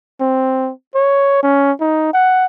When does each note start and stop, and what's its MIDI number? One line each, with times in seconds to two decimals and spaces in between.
0.21 0.71 60
0.95 1.40 73
1.43 1.72 61
1.80 2.08 63
2.13 2.46 78